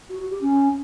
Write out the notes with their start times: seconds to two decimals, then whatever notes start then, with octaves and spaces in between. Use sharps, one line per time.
0.09 F#4
0.20 F#4
0.30 G4
0.41 C#4